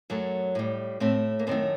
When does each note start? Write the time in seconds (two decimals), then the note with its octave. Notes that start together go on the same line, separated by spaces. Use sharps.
0.10 F#2 F#3 A3
0.55 A2 G3
1.00 A2 A3 C4
1.39 A#3
1.47 F#2 D#3 A3 C4